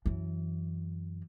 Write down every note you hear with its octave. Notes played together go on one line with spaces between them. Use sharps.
F#2 E3